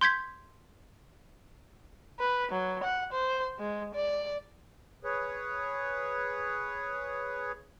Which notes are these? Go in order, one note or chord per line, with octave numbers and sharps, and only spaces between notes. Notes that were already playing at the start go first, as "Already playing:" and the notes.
C6 G6 G#6 B6
B4
F#3
F#5
C5
G#3
D5
G#4 B4 C#5